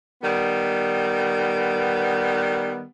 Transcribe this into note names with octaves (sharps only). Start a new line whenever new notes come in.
D#3 G3 B3